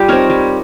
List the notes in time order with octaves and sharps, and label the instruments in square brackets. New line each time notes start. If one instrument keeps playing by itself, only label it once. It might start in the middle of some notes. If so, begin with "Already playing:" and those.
Already playing: [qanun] G3 F4 G4
C4 D#4 A#4 C#5
G3